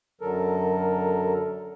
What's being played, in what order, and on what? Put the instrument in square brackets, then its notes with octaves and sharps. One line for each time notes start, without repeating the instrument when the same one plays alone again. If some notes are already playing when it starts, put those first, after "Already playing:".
[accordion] F#2 D3 F#3 A4 A#4